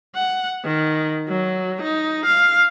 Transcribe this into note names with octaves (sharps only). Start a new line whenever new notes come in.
F#5
D#3
F#3
D#4
F5